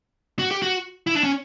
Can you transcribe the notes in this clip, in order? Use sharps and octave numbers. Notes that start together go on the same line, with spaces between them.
F#4
G4
F#4
E4
D4
C#4